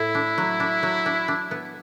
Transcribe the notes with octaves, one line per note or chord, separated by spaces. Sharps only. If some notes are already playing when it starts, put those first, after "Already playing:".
Already playing: A2 A3 E4
D4
F#3
D4
F#3
D4
D4
B3